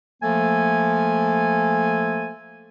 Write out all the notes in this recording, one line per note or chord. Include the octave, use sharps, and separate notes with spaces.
F3 A3 A#3 A4 G#5